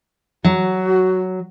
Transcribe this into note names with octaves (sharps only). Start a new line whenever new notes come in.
F#3 F#4